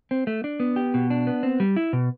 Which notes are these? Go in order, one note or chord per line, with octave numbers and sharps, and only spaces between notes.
C4
A3
D4
B3
G4
B2
D4
B3
C4
G3
E4
B2